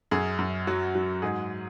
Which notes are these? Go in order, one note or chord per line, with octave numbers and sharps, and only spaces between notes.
F#2 G#4
F#2
F#3 F#4
F#3
G#2 G#4